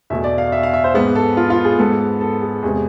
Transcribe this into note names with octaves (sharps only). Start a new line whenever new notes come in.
E2 B2 A3 E5
D5
F5
E5
F5
E5
C5
G#2 G#3 B3
A4
F4
F4
G#4
G#2 G#3 B3 A4
A4
G#4
E2 C3 G#3 B3